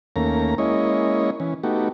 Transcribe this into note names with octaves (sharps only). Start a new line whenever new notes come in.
D#2 A3 A#3 C#4 A#5
G#3 A#3 C#4 E4 C#5 D#5
E3 C#4
A3 B3 D#4 F#4 G4